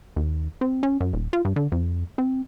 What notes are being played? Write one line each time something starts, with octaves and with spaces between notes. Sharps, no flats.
D#2
C4
C#4
F#2
D#1
F4
G2
D3
F2
C4